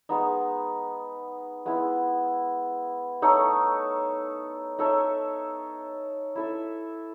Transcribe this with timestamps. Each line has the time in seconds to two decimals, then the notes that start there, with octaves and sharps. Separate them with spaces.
0.09 G#3 B3 D#4
1.66 G#3 B3 E4
3.22 A3 D#4 A4 C#5
4.79 D#4 A4 C#5 E5
6.36 E4 A4 E5